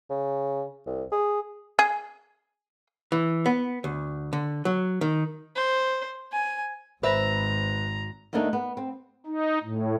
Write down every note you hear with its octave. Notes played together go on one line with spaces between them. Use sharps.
C#3
C2
G#4
G#4
E3
B3
D2
D3
F#3
D#3
C5
G#5
G#1 B4 C5 E5 A#5
D2 A3 A#3 D4 D#4
B3
C4
D#4
A2